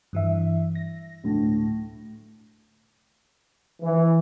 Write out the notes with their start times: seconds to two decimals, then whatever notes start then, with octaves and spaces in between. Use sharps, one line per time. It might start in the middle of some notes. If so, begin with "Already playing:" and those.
0.13 G2 E3 E5
0.75 A#6
1.24 D2 A2
3.83 E3